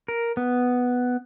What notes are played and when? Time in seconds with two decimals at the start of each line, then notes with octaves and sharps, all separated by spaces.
0.08 A#4
0.37 B3